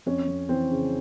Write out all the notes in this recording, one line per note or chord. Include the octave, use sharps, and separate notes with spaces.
F2 C#4
F2
E3 C4
C#3